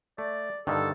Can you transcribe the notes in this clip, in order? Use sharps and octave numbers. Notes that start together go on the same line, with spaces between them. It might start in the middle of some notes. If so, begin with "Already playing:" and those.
A3 D5
G2 D3 D#3 A4